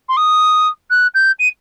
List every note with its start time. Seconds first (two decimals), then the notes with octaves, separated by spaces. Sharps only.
0.08 C6
0.17 D#6
0.90 F#6
1.14 G6
1.39 D#7